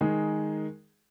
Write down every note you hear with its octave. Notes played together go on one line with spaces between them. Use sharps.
D#3 G#3 D#4 G#4